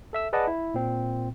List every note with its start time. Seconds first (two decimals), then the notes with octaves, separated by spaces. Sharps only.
0.13 A4 E5 E6
0.33 G#4 B4 D5 D#5 F#5 A5
0.47 E4
0.74 A#2 C4